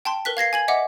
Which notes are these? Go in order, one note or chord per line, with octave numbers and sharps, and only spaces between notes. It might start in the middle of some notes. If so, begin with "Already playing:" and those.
G5 A5 C6
A#4 B4 F#6 B6
F5 G#6 A#6 C7
G#5 G#6 F#7
D#5 E5 F#5 D6